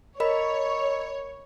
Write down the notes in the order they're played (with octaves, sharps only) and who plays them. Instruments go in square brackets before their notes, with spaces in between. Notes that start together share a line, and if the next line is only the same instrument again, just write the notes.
[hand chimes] A#4 D#5 B5 [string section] C#5